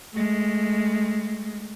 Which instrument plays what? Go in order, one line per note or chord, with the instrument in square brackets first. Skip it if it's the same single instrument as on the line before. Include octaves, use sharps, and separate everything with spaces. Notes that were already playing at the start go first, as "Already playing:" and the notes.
[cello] G#3 A3